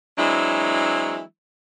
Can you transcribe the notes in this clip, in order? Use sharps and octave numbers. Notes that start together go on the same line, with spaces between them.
E3 F#3 G#3 C4 D4 E4